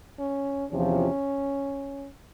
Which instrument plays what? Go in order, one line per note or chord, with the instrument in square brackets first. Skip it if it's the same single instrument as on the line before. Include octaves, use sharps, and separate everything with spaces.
[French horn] C#4
[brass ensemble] E2 C3 F3 [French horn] C#4